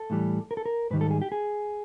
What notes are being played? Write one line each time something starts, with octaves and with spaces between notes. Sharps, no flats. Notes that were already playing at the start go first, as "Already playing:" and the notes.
Already playing: A4
A2 E3 G3
A#4
A4
A#4
G#2 D#3 G3 B4
A4
G#4
G4
G#4